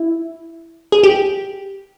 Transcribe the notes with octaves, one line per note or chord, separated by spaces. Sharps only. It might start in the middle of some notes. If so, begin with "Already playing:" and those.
Already playing: E4
G#4
G4